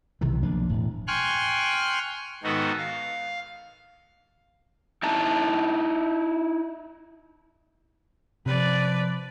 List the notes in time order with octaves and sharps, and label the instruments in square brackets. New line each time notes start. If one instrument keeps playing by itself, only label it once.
[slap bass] B1 C3 D#3 E3
B1 F3 A#3 D4
E1 A2
[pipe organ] G5 G#5 C6 C#6 F6 F#6
G#2 D#3 B3 D#4 F#4 A4
F5
[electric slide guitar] D#4 E4 A5 A#5
[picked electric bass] C3 [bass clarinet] F3 [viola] B4 D5